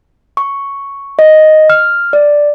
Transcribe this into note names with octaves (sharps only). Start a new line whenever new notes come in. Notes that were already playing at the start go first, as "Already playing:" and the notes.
C#6
D#5
F6
D5